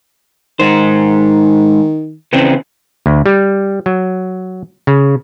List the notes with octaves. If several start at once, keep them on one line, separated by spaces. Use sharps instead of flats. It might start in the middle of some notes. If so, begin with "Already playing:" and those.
G#2 D#3 C5
C#3 E3 C4
D2
G3
F#3
C#3